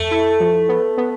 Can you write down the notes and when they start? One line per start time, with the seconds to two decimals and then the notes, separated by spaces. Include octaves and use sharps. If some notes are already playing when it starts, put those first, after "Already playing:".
Already playing: F2 A3
0.11 E4
0.40 F3
0.69 B3
0.98 B3